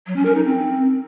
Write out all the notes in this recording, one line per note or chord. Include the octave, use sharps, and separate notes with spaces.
F#3
C#4
A#4
D#4
C4